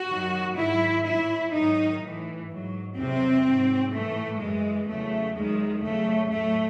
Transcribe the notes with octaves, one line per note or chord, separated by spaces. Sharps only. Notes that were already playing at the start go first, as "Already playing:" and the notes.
Already playing: F#4
F#2 D#3 F#3
G#2 D#3 F#3 E4
A2 F#3 E4
G#2 D#3 F#3 D#4
A2 E3
G#2 F#3
E2 C3 F#3 C4
G#2 F#3
A2 E3 A3
F#2 E3 G#3
E2 C#3 F#3 A3
E2 D#3 F#3 G#3
E2 C#3 F#3 A3
A2 F#3 A3